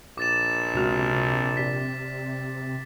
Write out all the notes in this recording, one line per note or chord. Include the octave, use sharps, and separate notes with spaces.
A#1 D6 A6 E7
C#2 C3 F#4 F6
G4 D5 B6